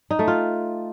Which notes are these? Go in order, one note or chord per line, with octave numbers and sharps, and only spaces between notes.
D#4
A3
F4